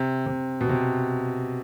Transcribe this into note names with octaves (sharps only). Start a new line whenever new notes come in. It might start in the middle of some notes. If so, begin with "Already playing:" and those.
Already playing: C3
C3
B2
C3